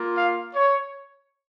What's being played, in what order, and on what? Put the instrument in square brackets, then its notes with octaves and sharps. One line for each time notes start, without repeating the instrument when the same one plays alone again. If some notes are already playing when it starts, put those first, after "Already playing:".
Already playing: [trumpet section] A#3 F4
F5
C#5